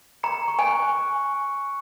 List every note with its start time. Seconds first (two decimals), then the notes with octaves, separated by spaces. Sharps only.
0.23 A#5 C#7
0.48 C#6
0.59 G#5
0.71 F#6